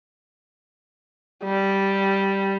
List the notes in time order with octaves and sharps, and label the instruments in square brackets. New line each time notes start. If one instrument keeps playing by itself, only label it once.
[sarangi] G3